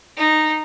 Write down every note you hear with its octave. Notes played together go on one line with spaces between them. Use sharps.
D#4